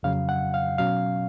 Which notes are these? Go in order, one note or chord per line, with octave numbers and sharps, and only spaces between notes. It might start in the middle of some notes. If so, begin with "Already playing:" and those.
F2 C#3 F#3 F5
F#5
F5
B2 F#3 C#4 F5